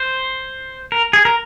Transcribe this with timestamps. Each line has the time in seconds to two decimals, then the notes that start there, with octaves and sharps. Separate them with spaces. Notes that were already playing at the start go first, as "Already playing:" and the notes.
Already playing: C5
0.92 A#4
1.13 G#4
1.25 A#4